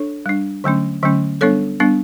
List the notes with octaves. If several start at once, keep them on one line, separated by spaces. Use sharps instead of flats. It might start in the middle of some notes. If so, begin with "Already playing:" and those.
Already playing: D4 A4 C#5
G3 D4
D3 F#3 A3 C#4
D3 F#3 A3 C#4
G3 B3 D4 A4 C#5
G3 B3 D4